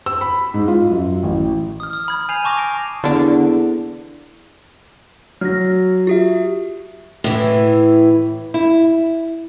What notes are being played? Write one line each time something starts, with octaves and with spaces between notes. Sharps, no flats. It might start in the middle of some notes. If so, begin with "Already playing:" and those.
E6
B5
G#2
F4
F#2
A1
D#6 F6
D#6
B5 G#6
G#5 G6 C7 D#7 F7
A5 C#6 D6 A#6 F7
D7
E2 D3 A#3 D4
F#3 F6 A#6
F4 G4 E5
A2 E3
E4